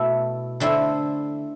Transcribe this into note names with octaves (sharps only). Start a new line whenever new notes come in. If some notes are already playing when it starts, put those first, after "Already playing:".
Already playing: B2 A3 E4
D3 A3 C4 E4